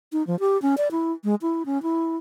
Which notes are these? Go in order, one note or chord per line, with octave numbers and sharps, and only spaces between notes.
D#4
F3
G4
C#4
D5
E4
G#3
E4
C#4
E4